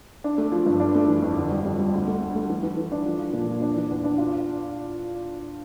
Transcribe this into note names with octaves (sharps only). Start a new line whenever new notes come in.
D4
A3
F3
G2
D4
A3
E3
F2
D3
G3
G3
G3
D2
A3
A3
A3
E3
E3
E3
D4
F3
F3
A#2
F3
D4
E3
E2
D4
F4